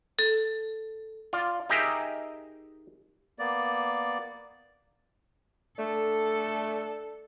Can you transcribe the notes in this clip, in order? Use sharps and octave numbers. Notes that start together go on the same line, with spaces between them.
A4
F4 D5
D#4 G4 G#4 A#4 D#5 E5
A#3 B3 D5
A3 D4 A4